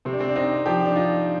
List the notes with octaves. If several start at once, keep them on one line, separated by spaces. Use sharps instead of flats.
C3 C4
D4
C4
D4
C4 D#4
F3 G4
D4
D#4 F4